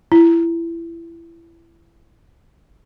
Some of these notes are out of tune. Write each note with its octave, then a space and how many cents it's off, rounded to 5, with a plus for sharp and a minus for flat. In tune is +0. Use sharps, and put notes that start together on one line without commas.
E4 +25